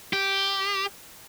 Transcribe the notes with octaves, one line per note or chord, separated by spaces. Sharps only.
G4